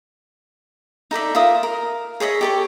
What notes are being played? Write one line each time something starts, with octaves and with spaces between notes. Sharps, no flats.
D#4 A4 D5 E5
F4 A#4 E5 D#6
A#4
G#4 C#5 D#5 E5
G4 A4 C#6